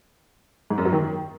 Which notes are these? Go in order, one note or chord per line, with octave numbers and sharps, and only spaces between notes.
G#2
F#2
F#3
D#3